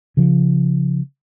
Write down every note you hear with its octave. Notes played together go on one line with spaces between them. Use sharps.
C#3 F3